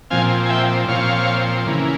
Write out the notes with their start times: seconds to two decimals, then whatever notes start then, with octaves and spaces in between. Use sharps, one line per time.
0.10 A#2 F3 C4 F5 G#5
0.46 G#5
0.50 E5 G5
0.88 A#2 F3 C4 C#5 F5
1.67 C#3 E3 A#3